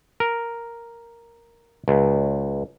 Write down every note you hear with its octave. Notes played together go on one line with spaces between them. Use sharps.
A#4
C#2